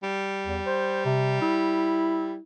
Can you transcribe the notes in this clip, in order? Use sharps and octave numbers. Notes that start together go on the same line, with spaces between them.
G3
E2
C5
C3
E4